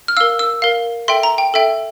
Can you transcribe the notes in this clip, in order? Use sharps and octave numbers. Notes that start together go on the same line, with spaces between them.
F6
A#4 F5 E6
E6
A#4 F5
A4 E5 G5 C6
A#5
G5
A4 E5 G5